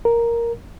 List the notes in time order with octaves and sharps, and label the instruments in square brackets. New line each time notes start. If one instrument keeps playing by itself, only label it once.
[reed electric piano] A#4